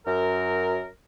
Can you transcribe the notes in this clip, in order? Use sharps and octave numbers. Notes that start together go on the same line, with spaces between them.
F#2 A#4